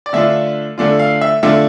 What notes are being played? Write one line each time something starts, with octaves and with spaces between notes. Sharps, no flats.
D5
D3 A3 D4 F4 E5
D3 A3 D4 F4
F5
E5
D3 A3 D4 F4 E5